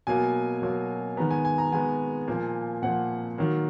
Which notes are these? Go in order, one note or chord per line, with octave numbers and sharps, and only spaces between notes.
B2 F#3 A#3 G#5
B2 F#3 A#3
D#3 G#3 B3 A#5
G#5
G#5
A#5
D#3 G#3 B3 G#5
A#2 F3 A#3
A#2 F3 A#3 F#5
D#3 F#3 A#3